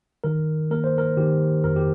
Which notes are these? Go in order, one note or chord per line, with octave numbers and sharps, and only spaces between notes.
D#3 A#4
A#3 A#4
C5
A#4
D#3 G4
F2 A#4
G4